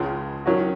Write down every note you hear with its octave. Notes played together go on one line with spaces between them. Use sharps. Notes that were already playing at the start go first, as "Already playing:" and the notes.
Already playing: C#2 C#3 F3 G#3
D#3 F#3 C#4 F#4